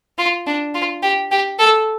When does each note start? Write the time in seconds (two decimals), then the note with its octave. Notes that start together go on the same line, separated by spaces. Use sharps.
0.18 F4
0.47 D4
0.75 F4
1.03 G4
1.31 G4
1.59 A4